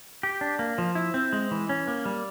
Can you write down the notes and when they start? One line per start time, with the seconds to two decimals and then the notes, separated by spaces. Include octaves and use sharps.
0.23 G4
0.41 D4
0.59 A#3
0.78 F3
0.95 E4
1.14 C4
1.33 G#3
1.51 E3
1.69 C#4
1.88 A#3
2.06 G3